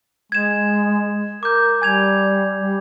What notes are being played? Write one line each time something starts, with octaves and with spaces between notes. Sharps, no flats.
G#3 G#6 E7
A#4 D6 G6
G3 G#5 G#6 F7
G3